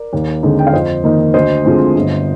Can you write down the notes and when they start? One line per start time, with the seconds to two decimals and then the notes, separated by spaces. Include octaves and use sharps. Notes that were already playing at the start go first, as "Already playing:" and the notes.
Already playing: A#4 D5
0.13 D#2
0.43 D3 G#3 C4 D#4
0.59 G5
0.67 F5
0.73 F2 C5 D#5
1.04 D#3 A#3 D#4
1.34 D2 C5 D#5
1.65 D3 F3 G#3 C4
1.95 G1